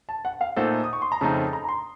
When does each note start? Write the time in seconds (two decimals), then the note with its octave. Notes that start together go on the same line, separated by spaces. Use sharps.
0.09 A5
0.25 F#5
0.41 F5
0.56 A#2 A3 D#4 A4 C5 F#5
0.84 D#6
0.93 C#6
1.02 C6
1.12 A#5
1.21 F2 C#3 A3 C4 D#4 A5
1.37 A5
1.53 A#5
1.64 A#5
1.69 C6